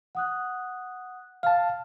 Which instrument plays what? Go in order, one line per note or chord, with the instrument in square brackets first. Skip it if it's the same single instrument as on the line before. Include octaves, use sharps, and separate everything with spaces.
[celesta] F#5 D#6 F#6
[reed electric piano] F5 A5 [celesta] F6